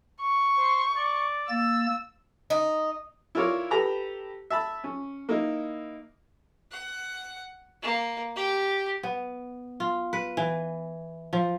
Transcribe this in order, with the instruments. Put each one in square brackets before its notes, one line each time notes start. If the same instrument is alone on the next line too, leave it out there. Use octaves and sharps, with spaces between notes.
[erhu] C#6
[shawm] C5
D5
[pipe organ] A#3 A6 [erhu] E6
[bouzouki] D#4
[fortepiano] E4 F4 A#4 C#5 D5
G4 A4 B4 A#5 B5
E5 A5 B5
C#4
A#3 D#4 E4
[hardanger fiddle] F#5
A#3
G4
[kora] B3
F4
B4
E3
F3